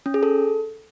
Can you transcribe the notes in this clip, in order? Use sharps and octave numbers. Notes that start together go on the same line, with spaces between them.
C#4
G#4
A4